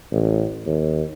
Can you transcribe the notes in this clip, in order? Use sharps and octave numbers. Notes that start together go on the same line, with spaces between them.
A1
D#2